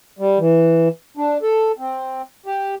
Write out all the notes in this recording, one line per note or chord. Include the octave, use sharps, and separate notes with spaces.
G3
E3
D4
A4
C4
G4